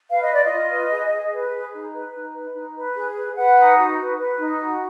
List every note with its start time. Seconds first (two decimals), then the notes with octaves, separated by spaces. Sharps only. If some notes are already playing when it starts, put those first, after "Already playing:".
0.10 B4 F5
0.22 D#5
0.30 F4 D5
0.44 D#5
0.51 F4
0.71 B4
0.92 G#4
1.12 G#4
1.32 B4
1.53 G#4
1.73 D#4
1.93 B4
2.14 D#4
2.34 B4
2.54 D#4
2.75 B4
2.96 G#4
3.15 B4
3.36 B4 F#5
3.57 D#4
3.77 F#4
3.97 B4
4.18 B4
4.38 D#4
4.58 F#4